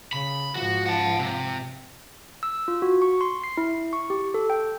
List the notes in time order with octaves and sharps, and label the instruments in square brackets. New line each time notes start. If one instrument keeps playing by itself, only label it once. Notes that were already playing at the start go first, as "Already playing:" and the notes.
[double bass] C#3 [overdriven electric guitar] B5
[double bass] G#2 F3 [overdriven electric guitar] F#4
[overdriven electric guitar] F#5 A5
C3
[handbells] E6
F4
F#4
C#6
C6
C7
E4
C#6
G4
A4
G5